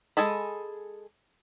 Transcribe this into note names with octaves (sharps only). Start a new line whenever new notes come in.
G#3 G#4 A4 B5